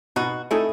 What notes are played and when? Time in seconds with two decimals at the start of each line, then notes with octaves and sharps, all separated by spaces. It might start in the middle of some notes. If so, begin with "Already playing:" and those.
0.16 B2 D#4 F#4
0.51 A3 D#4 E4 G#4 A4